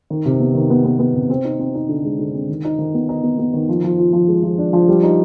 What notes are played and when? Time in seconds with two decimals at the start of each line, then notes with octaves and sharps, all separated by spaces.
0.10 D#3
0.25 C3
0.40 B3
0.55 D#3
0.70 B3
0.85 B3
0.99 B3
1.15 C3
1.30 C4
1.45 D#4
1.59 C4
1.75 D#4
1.89 D3
2.05 G#3
2.19 D3
2.34 C4
2.49 D#3
2.65 D#4
2.79 D#3
2.94 B3
3.09 D#4
3.24 B3
3.38 B3
3.54 D#3
3.69 F3
3.84 F3
3.98 F4
4.13 F3
4.28 G#3
4.43 F3
4.58 D4
4.73 F3
4.89 G3
5.03 D#4